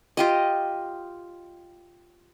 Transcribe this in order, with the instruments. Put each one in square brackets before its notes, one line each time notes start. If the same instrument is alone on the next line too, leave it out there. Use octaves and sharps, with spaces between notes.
[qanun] F4 G4 D#5